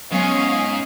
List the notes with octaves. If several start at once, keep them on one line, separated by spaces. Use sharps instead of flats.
G#2 F#3 B3 C#4 D#5 F5 G#5